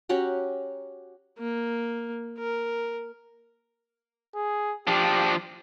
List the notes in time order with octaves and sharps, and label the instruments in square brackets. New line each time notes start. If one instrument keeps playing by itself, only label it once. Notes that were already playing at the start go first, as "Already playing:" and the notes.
[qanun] C#4 F#4 G4 A#5
[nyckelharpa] A#3
A#4
[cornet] G#4
[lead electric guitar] F3 D4 [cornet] G4